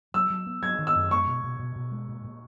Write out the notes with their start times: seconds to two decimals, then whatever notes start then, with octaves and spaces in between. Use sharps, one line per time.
0.14 F#3 E6
0.30 F#3
0.46 B3
0.62 F#3 G#6
0.79 D#3
0.87 E6
0.95 F#2
1.11 G#3 C#6
1.27 B2
1.44 B2
1.59 B2
1.76 B2
1.91 G#3
2.08 A#2
2.24 A#2